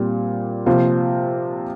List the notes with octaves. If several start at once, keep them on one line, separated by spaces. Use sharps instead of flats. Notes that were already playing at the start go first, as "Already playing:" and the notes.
Already playing: A#2 G3 C4
C3 F3 A#3 F4 C5